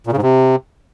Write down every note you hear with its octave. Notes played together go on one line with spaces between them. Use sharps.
A#2
C#3
G#2
C3